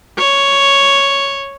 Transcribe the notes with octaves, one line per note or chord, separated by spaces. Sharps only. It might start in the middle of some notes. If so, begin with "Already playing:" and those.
C#5